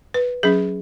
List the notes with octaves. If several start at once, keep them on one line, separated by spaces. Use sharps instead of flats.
B4
F#3 C#4 G#4